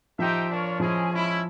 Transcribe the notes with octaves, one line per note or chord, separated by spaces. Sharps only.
F3 D#4 G4 C5 E5 G5
D4 F4 A#4 C#5
F3 G#3 C#4 E4 G#4
G#3 C#4 E4